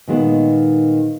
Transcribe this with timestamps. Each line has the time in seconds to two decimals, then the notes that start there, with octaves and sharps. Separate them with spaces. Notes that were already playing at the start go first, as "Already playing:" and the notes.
0.08 A#2 D#3 G#3 B3